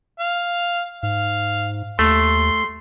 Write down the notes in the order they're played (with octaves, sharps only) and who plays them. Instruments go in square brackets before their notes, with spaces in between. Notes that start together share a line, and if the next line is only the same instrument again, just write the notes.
[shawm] F5
[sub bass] G#2 [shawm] F5
[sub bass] D#2 [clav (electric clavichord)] A3 [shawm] C6